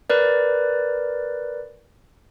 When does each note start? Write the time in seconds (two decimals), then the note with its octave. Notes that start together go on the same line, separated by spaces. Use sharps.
0.10 A#4 B4 D5